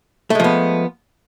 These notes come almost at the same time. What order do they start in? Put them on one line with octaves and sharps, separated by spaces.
A3 G#3 F3 B3